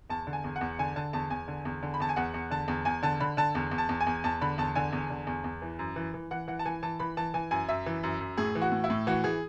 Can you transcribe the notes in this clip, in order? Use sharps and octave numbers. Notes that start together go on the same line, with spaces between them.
E2 A5
D3
G#5
E2
F#5
E2
D3 G#5
D3 A5
E2 A5
E2 G#5
D3
E2
D3
B5
E2 A5
G#5
E2 F#5
E2
D3 A5
E2
E2 G#5
D3 A5
D3 B5
D3 A5
E2
E2
A5
E2
G#5
E2
E2 A5
D3 B5
E2 A5
D3 G#5
E2
D3
E2
E2
E3
F#2
E3
E3
E3 F#5
E3 F#5
A5
E3 G#5
E3 A5
E3 B5
E3 A5
E3 G#5
F#2 G#5
F#2 E5
E3
F#2
F#2
A2 G#4
E3
F#4
A2
E4
A2
E3 F#4
E3 G#4